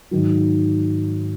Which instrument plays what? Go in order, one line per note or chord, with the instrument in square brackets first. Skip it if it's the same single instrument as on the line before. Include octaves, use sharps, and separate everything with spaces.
[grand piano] G#2 D#3 F#3